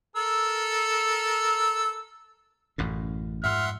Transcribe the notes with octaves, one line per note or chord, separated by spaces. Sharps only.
A4 A#4 E6
A1 F#2 A2
F2 G#2 E5 F#5 C6 F6